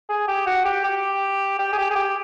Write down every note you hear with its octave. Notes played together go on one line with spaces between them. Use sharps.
G#4
G4
F#4
G4
G4
G4
G#4
G4
G#4
G4